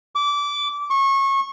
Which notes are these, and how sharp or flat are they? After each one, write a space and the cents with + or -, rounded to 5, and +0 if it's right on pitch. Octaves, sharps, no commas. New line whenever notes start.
D6 -20
C#6 -25